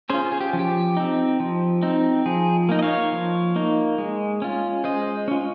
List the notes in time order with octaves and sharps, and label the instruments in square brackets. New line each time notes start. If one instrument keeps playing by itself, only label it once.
[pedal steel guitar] C#4 F4 G#4 C5
G#4
G4
F3
G4
C4 D#4
F3
C4 D#4
F3 G#4
A#3 D#4
D#5
C#5 F5
F3
A#3 D#4
G#3
C#4 F4
G#3 C5 D#5
C#4 F4